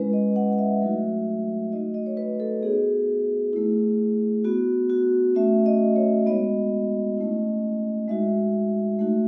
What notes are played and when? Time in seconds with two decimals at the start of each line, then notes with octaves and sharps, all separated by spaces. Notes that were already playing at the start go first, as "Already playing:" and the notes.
Already playing: G#3 C#4 E4 B4
0.13 D#5
0.36 F#5
0.53 F#5
0.58 E5
0.81 F#3 A3 D#4 F#4
1.72 A3 D#4 F#4 D#5
1.94 D#5
2.06 C#5
2.17 B4
2.40 A4
2.62 B3 D#4 F#4 G#4
3.53 A3 E4
4.45 B3 F#4
4.90 F#4
5.35 A3 C#4 F#4 E5
5.66 D#5
5.96 C#5
6.26 G#3 B3 D#4 F#4 D#5
7.17 A3 C#4 E4
8.08 G#3 D#4 F#4 E5
8.99 A3 D#4 F#4